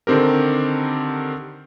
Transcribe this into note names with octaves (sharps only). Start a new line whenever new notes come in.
D3 D#3 C4 G4 A#4